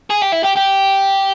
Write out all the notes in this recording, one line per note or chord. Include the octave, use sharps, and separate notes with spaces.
G#4
G4
E4
G4
G4